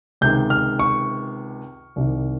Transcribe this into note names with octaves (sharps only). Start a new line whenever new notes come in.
C#2 C3 D#3 G6
F6
C#6
C2 C3 D#3